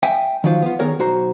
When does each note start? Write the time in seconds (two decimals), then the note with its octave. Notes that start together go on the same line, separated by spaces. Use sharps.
0.03 E5 G5 G#5
0.44 D#3 F3 F#3 F4 C5
0.62 B3 F4
0.79 D#3 B3 G#4 A#4 C#5
0.99 B1 F#4 C5 A#5